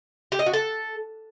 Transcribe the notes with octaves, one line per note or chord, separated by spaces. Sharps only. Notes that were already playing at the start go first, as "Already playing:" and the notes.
G4
D#5
F#4
A4